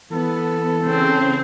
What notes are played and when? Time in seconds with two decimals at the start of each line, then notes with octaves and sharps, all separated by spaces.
0.12 E3 B3 A4
0.85 C#3 C4